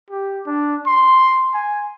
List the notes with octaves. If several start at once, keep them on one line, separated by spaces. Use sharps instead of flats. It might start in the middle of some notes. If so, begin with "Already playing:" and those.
G4
D4
C6
G#5